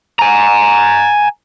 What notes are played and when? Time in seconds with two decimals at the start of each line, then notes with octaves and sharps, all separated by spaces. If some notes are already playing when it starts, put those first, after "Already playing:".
0.19 G#5 A#5